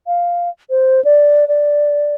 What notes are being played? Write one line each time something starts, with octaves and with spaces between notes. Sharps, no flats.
F5
C5
D5
D5